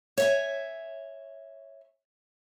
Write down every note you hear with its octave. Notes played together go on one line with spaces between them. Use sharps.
C#5 E5 G#5